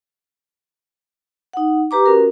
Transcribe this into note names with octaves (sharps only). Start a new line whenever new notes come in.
D#4 F#5
G4 B4 A#5 D6
C#4 F#4 A#4